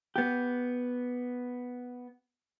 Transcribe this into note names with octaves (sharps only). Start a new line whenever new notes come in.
B3 G4